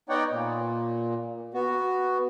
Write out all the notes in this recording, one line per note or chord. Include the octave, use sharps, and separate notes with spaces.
B3 D#4 C#5 D5 F#5 G5
A#2
B3 F#4